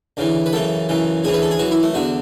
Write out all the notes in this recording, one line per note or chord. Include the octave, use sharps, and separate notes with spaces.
D2 C#3 E3
B4
F#2 C#3 E3 A4
F#2 C#3 E3
D2 C#3 E3 G#4
B4
A4
G#4
F#2 E3 F#4
E4
A3
E2 D3 F#4